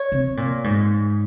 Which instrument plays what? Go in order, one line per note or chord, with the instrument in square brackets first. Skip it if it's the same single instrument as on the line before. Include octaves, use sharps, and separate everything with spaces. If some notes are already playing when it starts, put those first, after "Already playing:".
Already playing: [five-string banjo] C#5
[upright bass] C3
A#2
G#2